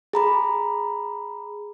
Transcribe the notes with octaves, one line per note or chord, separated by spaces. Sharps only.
G#4 A#5 B5